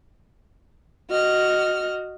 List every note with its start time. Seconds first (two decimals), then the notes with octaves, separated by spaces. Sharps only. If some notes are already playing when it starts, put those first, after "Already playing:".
1.10 F#4 D#5 F6